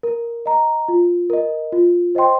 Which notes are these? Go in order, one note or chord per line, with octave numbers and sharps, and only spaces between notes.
A#4
D#5 A#5
F4
A#4 D#5
F4
C5 D#5 G5 C6